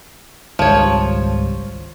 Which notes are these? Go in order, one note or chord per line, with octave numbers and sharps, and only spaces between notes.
G#1 C#2 F3 G3 C#5